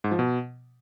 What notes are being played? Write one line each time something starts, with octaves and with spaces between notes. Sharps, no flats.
G#2
F3
B2